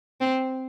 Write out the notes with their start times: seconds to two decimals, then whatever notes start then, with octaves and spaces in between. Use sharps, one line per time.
0.21 C4